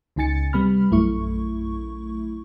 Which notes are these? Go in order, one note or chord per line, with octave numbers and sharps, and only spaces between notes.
C#2 C#3 D#4 G#5 A6 C#7
C3 G3 B3 B5 F6
A#1 F#2 A3 E4 C#6